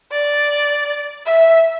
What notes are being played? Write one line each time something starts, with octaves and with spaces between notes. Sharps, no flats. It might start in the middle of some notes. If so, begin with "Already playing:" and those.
D5
E5